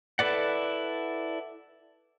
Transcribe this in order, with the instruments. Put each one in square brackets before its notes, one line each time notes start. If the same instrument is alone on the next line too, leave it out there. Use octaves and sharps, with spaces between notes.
[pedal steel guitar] E4 A4 B4 D5 F#5